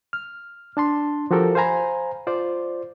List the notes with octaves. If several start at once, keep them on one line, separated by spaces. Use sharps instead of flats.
F6
D4 A5 C6
F3 F#4 G4 A4 A#4
C5 F5 G#5 A#5 B5
F4 C5 D5